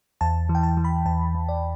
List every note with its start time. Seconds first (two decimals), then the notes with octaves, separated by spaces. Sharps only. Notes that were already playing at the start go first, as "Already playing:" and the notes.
0.21 E2 A5
0.49 E3
0.55 G5
0.63 A5
0.77 E3
0.84 B5
1.06 E2 A5
1.35 E2
1.49 D5